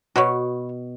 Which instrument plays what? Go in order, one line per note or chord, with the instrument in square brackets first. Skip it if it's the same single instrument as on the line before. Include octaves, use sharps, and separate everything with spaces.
[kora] B2 [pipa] F#4 B4 C#5